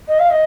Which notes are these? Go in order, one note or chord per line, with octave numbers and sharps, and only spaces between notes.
D#5
F5
D#5